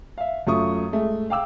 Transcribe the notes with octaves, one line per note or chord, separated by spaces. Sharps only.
E5 F5
F#2 A3 F4 C#6 D#6
G#3 A3
F5 G5 D6 E6